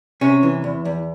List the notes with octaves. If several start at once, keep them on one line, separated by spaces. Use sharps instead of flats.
C3 C#4
E3
E2
E2